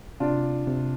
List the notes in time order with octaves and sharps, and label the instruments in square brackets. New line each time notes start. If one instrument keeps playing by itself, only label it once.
[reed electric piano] C3 [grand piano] D4 F4
[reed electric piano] C3